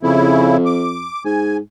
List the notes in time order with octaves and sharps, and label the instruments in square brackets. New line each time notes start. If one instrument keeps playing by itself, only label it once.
[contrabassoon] F2 [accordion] C#3 E4
[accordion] D6
[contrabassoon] G#2 [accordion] G#5